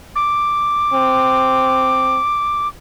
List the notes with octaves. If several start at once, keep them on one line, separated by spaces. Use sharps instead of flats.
D6
C4